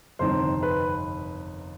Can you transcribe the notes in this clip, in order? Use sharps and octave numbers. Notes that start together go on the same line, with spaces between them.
G1 F2 C3 D#3 C5
B4